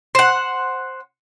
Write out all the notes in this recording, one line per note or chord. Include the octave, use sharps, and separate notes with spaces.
C5 F#5